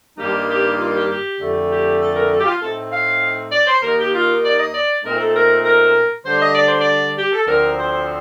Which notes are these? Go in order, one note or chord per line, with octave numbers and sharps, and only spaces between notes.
G2 D#3 G3 A#3 D#4 G4
G4
F4
G4
G4
F2 D3 A3
G4
A4
A#4
A4
G4
F4
A2 A3 C4 D#4 A4
F5
D5
C5
D#2 D#3 A#3 D#4 A#4
G4
F4
D5
D#5
D5
A#2 A3 C4 D#4 A#4
A4
A#4
A#4
D3 G3 D4 C5
D#5
D5
C5
D5
G4
A4
D2 D3 F3 C4 A#4
C5